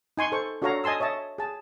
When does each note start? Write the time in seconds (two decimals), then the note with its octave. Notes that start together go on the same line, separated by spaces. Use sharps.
0.17 D#4 G#5 C6 C#6
0.32 A4 C5 C#6
0.62 D4 F#4 A4 C#5 F5 A#5
0.84 D#5 G#5 A5 C6 E6
1.00 C#5 D#5 E5 A5
1.38 G#4 A5